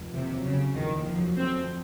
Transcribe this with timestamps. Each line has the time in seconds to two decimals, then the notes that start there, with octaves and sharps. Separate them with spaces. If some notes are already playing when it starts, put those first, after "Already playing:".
Already playing: F1
0.14 D#2 C3
0.35 F#3
0.45 C#3
0.55 C#3
0.75 F1 D#3
0.96 D#2
1.06 F3
1.16 F#3
1.37 A3 C4
1.57 F2